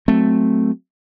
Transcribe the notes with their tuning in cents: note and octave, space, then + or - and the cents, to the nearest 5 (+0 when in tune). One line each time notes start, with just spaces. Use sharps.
F#3 +0 A3 +0 C4 +0